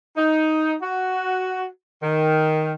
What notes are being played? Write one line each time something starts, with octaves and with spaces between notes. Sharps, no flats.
D#4
F#4
D#3